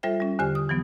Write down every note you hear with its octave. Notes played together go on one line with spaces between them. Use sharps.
G3 F4 A4 C5 E5 G5
G3 C#4
E2 D3 G4 C5 G#5 F6
D#6
E3 F#3 B3